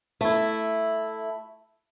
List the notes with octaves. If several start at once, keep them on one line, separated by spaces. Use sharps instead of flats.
A3 E4